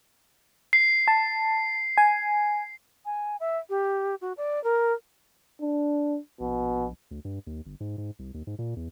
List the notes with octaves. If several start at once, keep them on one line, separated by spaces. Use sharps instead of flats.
C7
A5
G#5
G#5
E5
G4
F#4
D5
A#4
D4
A#1 B2
D2
G2
D#2
G1
G#2
G#2
C2
D#2
G#2
A#2
E2